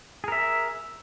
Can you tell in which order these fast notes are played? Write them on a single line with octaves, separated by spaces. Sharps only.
G#4 A#4 E5